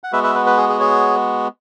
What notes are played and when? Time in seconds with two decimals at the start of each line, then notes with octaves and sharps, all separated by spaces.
0.04 F#5
0.12 G#3 B3 F#4 B4 E5
0.23 B4 E5
0.35 B4
0.46 B4
0.57 G#4
0.69 G#4
0.80 G#4 C#5